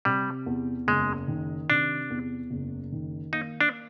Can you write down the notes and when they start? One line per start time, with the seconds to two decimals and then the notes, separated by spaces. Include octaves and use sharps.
0.05 C3 G3
0.46 E2
0.87 F#1 G#3
1.28 D#3
1.69 C3 D4
2.10 E2
2.51 F#1
2.92 D#3
3.33 A#3 D#4
3.61 D4